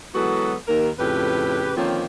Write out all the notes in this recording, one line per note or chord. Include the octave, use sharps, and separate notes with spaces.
E3 F#3 G#3 B3 F#4 A4
D#2 A#4
F2 A2 C#3 G4 B4
D3 D#3 F3 A#3 C4 C#4